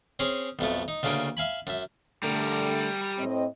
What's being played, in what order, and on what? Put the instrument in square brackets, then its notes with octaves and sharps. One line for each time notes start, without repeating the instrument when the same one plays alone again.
[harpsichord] C4 C#4 G#4
B1 F2 A3
D#4
D2 C#3 A3 A#3 G5 G#5
E5 F5 G#5 B5
F#2 E5
[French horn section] D3 A3 [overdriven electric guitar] G3 A#4
[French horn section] A2 C4 D#5